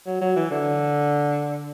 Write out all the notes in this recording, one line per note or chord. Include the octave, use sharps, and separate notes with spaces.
F#3
F#3
E3
D3